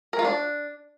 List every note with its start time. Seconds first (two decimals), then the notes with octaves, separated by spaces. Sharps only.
0.13 A#4
0.19 F4
0.25 D4